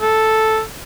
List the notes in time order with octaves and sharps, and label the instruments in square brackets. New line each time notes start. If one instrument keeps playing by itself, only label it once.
[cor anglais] A4